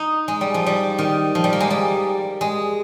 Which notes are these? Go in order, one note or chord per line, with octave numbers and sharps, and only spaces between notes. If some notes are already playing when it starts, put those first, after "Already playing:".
Already playing: D#4
G#3
G3
F3
G3
D#3
F3
G3
A#3
G#3
G3
G#3